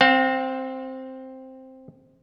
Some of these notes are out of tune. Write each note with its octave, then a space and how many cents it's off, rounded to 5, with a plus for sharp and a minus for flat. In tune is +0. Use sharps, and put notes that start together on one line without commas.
C4 +0 F5 +45